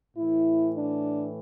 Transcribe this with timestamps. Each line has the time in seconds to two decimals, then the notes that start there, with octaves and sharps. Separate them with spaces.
0.17 A2 E3 E4
0.75 D4